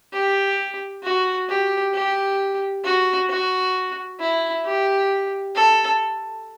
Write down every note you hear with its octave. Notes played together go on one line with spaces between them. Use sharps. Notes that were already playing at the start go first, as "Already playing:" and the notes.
G4
F#4
G4
G4
F#4
F#4
E4
G4
A4